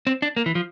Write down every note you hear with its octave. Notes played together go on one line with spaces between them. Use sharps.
C4
D4
A#3
E3
F3